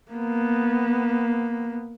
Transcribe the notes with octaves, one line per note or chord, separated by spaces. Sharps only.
A#3 B3